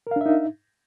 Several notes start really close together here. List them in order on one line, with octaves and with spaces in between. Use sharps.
A#4 F5 D4 E5 D#4